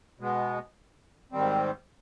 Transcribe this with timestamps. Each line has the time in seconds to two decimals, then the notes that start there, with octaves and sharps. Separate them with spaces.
0.19 B2 G#3 B3
1.32 G#2 D#3 G3 C4